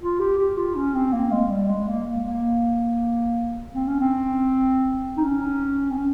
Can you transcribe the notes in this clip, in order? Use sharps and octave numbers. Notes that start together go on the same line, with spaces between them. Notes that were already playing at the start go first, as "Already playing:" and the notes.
F4
G4
G4
F4
C#4
C4
A#3
G#3
G3
G#3
A#3
A#3
C4
C#4
C4
D#4
C#4
C4
C#4